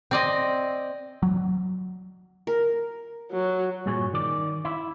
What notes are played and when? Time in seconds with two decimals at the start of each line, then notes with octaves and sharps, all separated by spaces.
0.11 C4 D5 D#5
1.23 F#3
2.47 A#4
3.32 F#3
3.86 G2 A#2 G#3 G#4 C#5
4.13 D#3 D5
4.65 E4